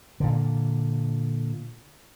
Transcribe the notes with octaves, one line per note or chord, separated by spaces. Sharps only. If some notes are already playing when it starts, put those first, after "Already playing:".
A#2 D3